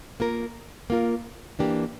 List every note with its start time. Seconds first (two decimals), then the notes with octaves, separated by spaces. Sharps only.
0.20 A#3 F4 A#4
0.90 A#3 F4 A#4
1.59 E3 A#3 D4 G4